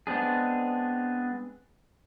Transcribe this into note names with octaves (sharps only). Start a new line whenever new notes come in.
G#3 B3 C4 D4 G#4